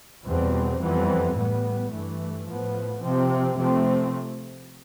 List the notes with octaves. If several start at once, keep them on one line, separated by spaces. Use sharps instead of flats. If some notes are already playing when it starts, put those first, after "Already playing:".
E2 B2 G3 C4
F2 E3 G3 B3
A2 G3 B3
G2 E3 A3
A2 F3 B3
C3 F3 C4
C3 F3 A3 C4